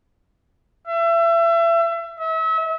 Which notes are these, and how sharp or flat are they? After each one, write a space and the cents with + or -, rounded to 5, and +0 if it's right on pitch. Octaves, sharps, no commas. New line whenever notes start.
E5 +30
E5 -35